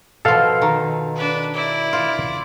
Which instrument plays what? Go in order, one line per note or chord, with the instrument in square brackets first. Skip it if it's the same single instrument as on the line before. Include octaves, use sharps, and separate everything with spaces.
[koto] B2 F3 [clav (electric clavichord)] A4 F5
[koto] D#3
[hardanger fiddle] D4 B4
E4 D5
[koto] F4